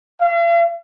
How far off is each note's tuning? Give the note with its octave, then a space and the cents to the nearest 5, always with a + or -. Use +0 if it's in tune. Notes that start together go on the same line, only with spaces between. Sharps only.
F5 -45